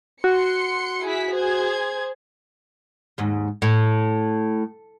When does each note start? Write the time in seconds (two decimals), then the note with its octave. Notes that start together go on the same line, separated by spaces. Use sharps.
0.24 F#4 C6 C#7
1.05 E4 G#4 B6
1.34 G#4 C5 G#6
3.18 D#2 G#2
3.62 A2